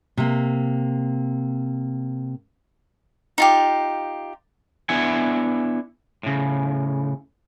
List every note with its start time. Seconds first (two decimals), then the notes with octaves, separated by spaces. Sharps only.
0.17 C3 A#3
3.38 D#4 F4 G4
4.89 B3 D4 E4 E5 F#5 G#5
6.23 A2 C#3